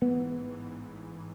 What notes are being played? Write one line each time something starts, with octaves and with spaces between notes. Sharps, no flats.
A1 G#2 E3 B3
A1 G#2 E3